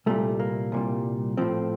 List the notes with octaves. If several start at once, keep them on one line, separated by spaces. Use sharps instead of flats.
C2 A#2 G3 A3
A#3
C2 A#2 G3
A2 F3 C4